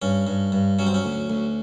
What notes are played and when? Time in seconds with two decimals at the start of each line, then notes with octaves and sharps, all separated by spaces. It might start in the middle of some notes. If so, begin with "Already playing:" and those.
0.02 G2 C#4
0.27 G2
0.52 G2
0.79 F#3 C#4
0.86 C4
0.94 C#4
1.05 D2
1.30 D2